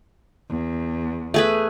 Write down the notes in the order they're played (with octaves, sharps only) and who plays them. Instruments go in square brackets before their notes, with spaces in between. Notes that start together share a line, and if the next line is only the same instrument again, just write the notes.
[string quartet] E2
[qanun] A3 G#4 B4